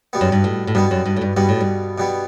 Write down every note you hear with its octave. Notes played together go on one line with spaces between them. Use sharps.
B2 G3 B3
F#2
G2
A2
A2
G2 B2 G3 B3
F#2
G2
A2
G2
G2 B2 G3 B3
A2
G2
B2 G3 B3